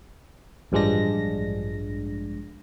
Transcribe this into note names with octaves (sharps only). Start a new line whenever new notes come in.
A1 G2 F3 G#3 D4 A#6